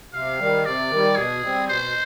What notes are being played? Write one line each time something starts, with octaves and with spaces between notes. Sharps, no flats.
C3 F5
D#3 G3
C3 D5
D#3 G3
B2 G#4
G3 C4
B2 C5